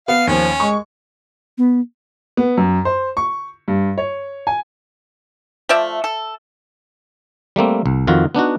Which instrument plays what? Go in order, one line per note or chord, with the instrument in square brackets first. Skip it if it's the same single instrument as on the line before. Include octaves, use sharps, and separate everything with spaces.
[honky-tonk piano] B3 [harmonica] F5
[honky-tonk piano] D#2 [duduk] F3 [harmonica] C#4
[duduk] G#3 [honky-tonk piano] C#6
[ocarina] B3
[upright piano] B3
F#2
C5
C#6
G2
C#5
G#5
[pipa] F3 A3 D5 E5
A4
[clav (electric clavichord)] G3 A3 A#3 C4
C2
F2 D#3 F4 F#4
B3 D4 D#4 F#4